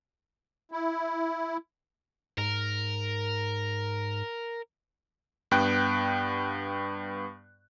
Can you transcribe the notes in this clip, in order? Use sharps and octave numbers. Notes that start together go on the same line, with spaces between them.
E4
G#2 A#4
G2 B3 G5 F#6